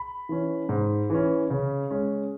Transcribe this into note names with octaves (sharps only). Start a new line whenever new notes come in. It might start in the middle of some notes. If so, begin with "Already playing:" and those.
Already playing: B5
E3 C#4
G#2
E3 C#4
C#3
G#3 C#4